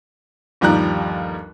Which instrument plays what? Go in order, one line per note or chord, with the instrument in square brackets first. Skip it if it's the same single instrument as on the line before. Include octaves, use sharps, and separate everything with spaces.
[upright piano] G1 D#2 F3 G3 A#5 F#6